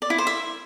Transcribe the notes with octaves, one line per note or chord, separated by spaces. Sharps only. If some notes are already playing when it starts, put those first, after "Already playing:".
D5
E4
C5
E5